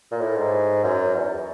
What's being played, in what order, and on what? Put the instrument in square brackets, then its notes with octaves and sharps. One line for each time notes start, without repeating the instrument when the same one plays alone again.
[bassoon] A#2
A2
G#2
F#2
E2